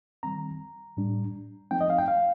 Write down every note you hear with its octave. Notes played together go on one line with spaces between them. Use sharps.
D#3 G3 C4 A#5
A2 G3 D4
F3 A3 C4 D#4 G5
D#5
F5
G5
F5